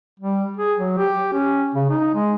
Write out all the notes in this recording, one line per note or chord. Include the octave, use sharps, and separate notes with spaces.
G3
G#4
F#3
G4
C#4
C#3
D#4
G#3